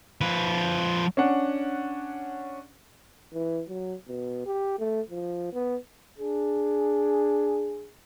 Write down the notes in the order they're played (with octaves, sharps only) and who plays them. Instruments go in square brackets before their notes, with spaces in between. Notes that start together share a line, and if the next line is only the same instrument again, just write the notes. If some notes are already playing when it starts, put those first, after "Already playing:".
[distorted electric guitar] F3 B4
[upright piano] C#4 D4 F#5
[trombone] E3
F#3
B2
G4
A3
F3
B3
[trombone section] D4 G#4